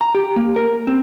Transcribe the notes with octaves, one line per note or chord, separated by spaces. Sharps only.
A#5
G4
A#3
A#4
C4